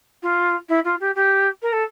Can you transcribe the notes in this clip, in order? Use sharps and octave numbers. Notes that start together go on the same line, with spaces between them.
F4
E4
F4
G4
G4
A#4
A4